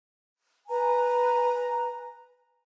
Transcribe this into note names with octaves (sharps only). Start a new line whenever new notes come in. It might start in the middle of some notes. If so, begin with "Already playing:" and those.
B4 G#5 A#5